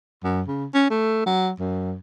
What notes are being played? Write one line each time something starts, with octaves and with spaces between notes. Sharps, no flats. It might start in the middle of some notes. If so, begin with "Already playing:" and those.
F#2
C#3
C#4
A3
F#3
F#2